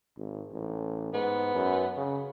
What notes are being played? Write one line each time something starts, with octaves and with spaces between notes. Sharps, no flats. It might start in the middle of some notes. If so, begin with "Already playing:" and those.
G#1
A1
G#2 B3
F#2
C#3